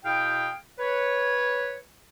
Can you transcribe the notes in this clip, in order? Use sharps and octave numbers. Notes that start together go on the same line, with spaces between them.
B2 E4 G#4 F5 G5
B4 C#5